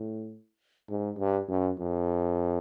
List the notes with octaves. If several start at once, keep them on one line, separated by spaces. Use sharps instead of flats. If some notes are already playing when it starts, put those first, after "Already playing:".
Already playing: A2
G#2
G2
F#2
F2